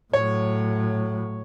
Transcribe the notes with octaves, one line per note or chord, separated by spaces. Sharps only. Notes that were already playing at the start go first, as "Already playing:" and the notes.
A2 F#3 C#5